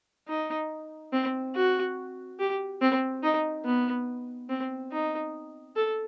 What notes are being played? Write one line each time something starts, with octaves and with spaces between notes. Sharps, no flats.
D#4
C4
F#4
G4
C4
D#4
B3
C4
D#4
A4